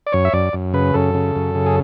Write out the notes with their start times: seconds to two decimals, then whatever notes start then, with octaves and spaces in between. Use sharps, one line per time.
0.07 D5
0.12 F#2 C#5
0.25 E5
0.33 F#2 D5
0.53 F#2
0.74 C#3 B4
0.94 F#2 A4
1.14 C#3
1.36 F#2
1.55 C#3
1.66 G#4